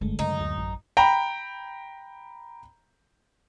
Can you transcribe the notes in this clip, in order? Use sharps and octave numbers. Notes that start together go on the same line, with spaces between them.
F#1 G2 D3 G#3 A3
F#2 C#3 D#4
D2
A1
G5 A#5 B5